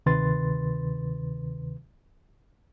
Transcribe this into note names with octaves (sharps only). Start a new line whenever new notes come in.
D2 C3 D#3 B4 C6 A6